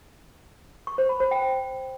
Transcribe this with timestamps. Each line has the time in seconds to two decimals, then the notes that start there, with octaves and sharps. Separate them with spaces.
0.87 C#6
0.98 C5
1.09 B5
1.20 C5
1.31 G5